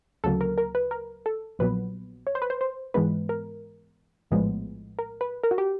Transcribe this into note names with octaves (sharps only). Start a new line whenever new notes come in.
D2 C#3 F#3 A#3 A4
A#4
A#4
B4
A#4
A4
A#1 A#2 F#3 B3 B4
C#5
C5
B4
C5
C5
G#2 E3 G#3 B3 B4
A#4
A#1 A2 F3 G#3 B3
A#4
B4
A#4
F#4
G4